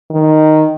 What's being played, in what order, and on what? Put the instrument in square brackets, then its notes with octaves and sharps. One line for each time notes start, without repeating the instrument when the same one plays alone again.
[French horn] D#3